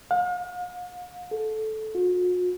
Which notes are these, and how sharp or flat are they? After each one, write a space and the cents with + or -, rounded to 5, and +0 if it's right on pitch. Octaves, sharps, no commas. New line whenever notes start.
F5 +45
A4 -15
F#4 -45